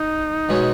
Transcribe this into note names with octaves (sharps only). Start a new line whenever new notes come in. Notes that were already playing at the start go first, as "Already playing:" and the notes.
Already playing: D#4
B2 G#3 C#4 F#4 C#5